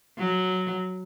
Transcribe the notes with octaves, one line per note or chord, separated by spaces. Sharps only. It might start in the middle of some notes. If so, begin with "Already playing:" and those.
F#3